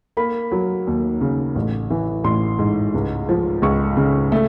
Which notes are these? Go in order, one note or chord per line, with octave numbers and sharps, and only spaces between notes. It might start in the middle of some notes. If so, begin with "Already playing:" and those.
A#3 B5
F#3
D#2
C#3
A1
E3
A1 C6
G#2
C#2
F3
C#2 C#6
C#3
A3